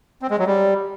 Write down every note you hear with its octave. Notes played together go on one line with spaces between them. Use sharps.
C4
G#3
F#3
G3